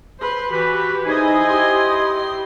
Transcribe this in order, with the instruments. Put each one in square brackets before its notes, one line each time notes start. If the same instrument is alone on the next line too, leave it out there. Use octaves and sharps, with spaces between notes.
[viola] B4 C5
[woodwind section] E3 B4 [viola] F#4 G4 [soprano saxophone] B5
[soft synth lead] D#4 [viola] E4 D#5 [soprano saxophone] G#4 [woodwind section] C5 G#5
[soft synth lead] G4 [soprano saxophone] C6